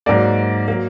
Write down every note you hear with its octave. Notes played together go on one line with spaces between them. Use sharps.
G#2 F#3 A#3 D5
F#3 A#3